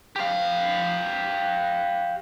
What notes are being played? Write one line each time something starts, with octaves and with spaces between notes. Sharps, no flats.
G4 F5